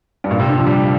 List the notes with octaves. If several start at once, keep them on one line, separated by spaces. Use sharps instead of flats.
G2
A#2
C3
D3
F3
G3